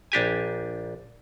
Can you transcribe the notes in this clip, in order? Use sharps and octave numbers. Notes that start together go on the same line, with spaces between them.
A#1 D4 G4 G#5